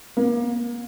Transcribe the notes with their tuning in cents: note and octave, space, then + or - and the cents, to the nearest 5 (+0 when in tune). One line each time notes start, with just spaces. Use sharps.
A#3 +35